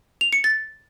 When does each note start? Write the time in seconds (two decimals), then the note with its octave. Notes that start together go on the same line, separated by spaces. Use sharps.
0.21 F7
0.33 C#7
0.44 A6